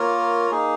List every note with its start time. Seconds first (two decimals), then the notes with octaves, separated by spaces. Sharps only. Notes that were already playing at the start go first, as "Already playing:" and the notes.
Already playing: A#3 F4 A#4 C#5
0.51 A#3 D#4 G#4